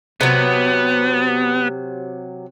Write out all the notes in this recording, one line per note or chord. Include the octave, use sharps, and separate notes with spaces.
C3 F#3 B3